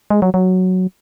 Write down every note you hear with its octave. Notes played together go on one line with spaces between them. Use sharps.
G#3
F#3
F#3